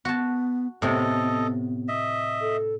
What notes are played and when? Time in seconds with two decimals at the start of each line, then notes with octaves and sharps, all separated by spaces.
0.05 B3 F#4 A5
0.82 A2 C3 B3 A4 D#5
1.88 D#5 E5
2.41 A4